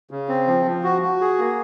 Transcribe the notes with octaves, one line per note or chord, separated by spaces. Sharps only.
C#3
C4
F3
F3
F#4
F#4
G#4
A#3